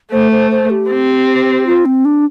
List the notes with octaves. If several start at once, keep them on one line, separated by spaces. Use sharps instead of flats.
A3 C5
C5
C5
G4
C4
F4
C4
D4